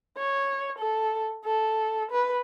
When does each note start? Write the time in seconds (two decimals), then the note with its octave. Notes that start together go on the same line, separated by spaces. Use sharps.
0.18 C#5
0.78 A4
1.45 A4
2.11 B4